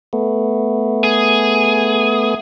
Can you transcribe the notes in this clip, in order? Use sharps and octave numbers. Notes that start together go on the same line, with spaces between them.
A3 B3
G#4